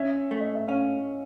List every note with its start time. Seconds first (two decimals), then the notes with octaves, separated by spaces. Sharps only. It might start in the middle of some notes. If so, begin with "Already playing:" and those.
Already playing: C#4 E5
0.31 A3
0.40 D#5
0.55 E5
0.68 C#4 F5